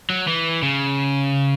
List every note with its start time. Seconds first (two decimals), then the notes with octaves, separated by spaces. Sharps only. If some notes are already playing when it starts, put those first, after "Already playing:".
0.10 F#3
0.27 E3
0.62 C#3